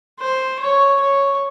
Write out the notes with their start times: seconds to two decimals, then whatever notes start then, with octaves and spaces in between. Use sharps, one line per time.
0.20 C5
0.60 C#5
1.01 C#5